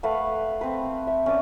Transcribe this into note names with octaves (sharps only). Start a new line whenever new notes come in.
A3 B4 F5 F#5
C4 B4
E5
C#4 D5 D#6